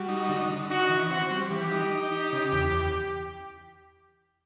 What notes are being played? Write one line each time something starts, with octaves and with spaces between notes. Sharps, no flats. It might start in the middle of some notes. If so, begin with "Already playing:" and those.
Already playing: G3 F#4
D#4
D3
D3
D#4 F#4
E3
C4 F#4
G3
E3 G4
D#4
D#4
D#4
C#3
E2
E2